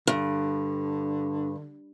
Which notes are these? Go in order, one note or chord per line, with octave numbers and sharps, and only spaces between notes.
G2 D3